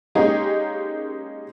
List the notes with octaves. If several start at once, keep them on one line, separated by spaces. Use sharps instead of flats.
G#3 A#3 C#4 D#4 G4 G#4